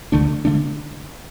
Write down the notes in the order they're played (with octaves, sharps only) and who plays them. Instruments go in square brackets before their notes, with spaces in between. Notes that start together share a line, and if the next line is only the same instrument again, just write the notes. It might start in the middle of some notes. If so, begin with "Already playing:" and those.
[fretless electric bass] D2 D3 A3 D4
D3 A3 D4